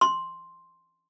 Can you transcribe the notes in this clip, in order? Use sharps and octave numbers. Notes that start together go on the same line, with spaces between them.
C6